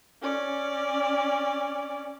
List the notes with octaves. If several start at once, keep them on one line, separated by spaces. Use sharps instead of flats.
C#4 D5